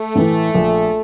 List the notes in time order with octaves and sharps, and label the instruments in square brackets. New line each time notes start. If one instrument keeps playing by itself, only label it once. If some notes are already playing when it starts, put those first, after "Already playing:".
Already playing: [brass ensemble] A3
[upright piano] A2 E3
A#1